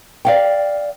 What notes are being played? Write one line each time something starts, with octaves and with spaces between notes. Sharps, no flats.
D5 F5 G5